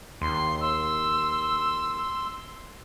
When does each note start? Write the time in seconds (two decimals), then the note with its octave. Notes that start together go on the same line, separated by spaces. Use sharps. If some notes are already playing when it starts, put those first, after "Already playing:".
0.21 D#2 C6
0.61 C6 E6